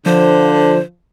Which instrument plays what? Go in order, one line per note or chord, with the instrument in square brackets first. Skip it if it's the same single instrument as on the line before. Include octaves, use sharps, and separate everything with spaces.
[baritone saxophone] D3 [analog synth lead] F3 [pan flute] C5